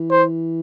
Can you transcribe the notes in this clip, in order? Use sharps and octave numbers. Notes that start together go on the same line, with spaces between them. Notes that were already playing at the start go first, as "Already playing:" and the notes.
Already playing: E3
C5